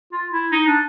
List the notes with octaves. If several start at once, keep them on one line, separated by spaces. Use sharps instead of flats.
F4
E4
D#4
D4